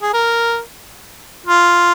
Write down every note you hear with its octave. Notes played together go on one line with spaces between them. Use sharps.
G#4
A#4
F4